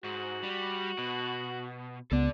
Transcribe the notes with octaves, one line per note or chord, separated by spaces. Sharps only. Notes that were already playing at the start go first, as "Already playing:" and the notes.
G#2 F#4
G3
B2
C#2 B3 A4 D5